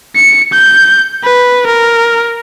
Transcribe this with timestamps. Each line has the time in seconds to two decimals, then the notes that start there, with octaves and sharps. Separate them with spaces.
0.16 C#7
0.53 G6
1.24 B4
1.67 A#4